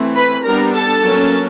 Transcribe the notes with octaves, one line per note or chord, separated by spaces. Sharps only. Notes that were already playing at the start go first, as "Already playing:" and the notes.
Already playing: E3 A3 C4
B4 B5
G3 B3 D4 A#4 A#5
A4 A5
F#3 A#3 C#4